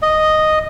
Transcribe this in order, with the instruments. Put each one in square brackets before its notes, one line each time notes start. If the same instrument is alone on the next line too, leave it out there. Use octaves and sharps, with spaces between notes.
[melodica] D#5